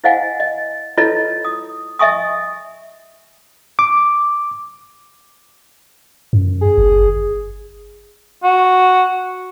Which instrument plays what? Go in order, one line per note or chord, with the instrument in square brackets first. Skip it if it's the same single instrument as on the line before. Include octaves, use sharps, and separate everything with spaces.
[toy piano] E4 C5 D#5 F5 F#5 G#5
D#5
E4 F4 A4 B4 C#5 D#5
D#6
D#5 E5 G#5 C#6 D#6
[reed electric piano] D6
[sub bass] F#2
[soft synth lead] G#4
[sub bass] G1
[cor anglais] F#4